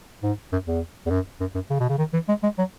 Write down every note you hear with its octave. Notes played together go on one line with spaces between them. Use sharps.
G#2
F#2
E2
E2
F#2
F#2
F#2
C#3
B2
C#3
D#3
E3
G#3
G#3
F#3